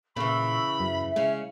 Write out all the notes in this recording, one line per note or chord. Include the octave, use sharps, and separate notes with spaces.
A#2 C#3 E3 B5 C#6 E6
F#2 E5
C#3 G#3 C#4